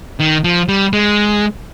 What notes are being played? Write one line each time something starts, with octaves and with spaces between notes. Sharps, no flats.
D#3
F3
G3
G#3